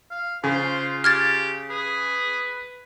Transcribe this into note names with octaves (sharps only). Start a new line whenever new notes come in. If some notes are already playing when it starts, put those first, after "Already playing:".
F5
C#3 F4 C5
G4 F6 G#6 A6
G#4 B4